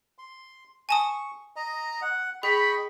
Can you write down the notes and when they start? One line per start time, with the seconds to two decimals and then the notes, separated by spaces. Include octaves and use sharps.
0.18 C6
0.89 G#5 A5 C#6 D#6
1.56 D#5 A#5
2.02 F#5
2.43 G#4 D#5 G5 B5 C#6